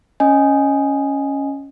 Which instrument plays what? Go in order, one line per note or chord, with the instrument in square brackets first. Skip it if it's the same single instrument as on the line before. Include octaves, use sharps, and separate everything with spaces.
[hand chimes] C#4 D#5 G#5